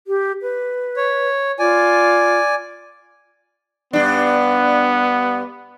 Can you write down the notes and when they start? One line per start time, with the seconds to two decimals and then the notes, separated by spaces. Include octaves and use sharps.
0.07 G4
0.42 B4
0.97 C#5
1.59 F4 D5 G#5
3.93 G2 B3 D4